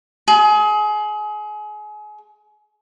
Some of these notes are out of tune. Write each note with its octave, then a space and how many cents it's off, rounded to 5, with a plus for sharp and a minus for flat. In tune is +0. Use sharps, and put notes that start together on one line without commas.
G#4 +30